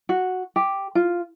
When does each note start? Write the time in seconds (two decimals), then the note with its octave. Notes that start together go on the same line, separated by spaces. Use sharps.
0.09 F#4
0.56 G4
0.95 F4